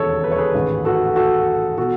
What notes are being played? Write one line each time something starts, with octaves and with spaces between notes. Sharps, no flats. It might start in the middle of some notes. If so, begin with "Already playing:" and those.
Already playing: E1 D#2 C#3 E3 A4 C#5
B4
C#5
G#4 B4
A1 G#2 D#3
F#4 A4
F#4 A4
B2 F#4 A4